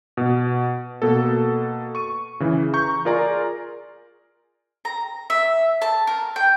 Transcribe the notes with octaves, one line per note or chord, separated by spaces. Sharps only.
B2
B2 A#3 A4
C#6 D#7
C#3 E3
A#5 C#6 G6
F4 G#4 A#4 D5 G#5 A#5
A#5
E5
A5
A#4
G5